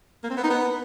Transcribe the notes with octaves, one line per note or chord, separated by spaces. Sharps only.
A#3
C4
B3
D#4
B3